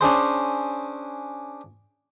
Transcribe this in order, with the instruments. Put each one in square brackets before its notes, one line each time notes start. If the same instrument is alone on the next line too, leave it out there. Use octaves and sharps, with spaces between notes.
[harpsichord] C#4 D4 G#4 C5